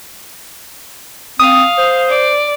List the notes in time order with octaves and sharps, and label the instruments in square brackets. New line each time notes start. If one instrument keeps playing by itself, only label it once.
[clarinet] C4 [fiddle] F5 [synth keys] D#6
[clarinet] C5
[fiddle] D5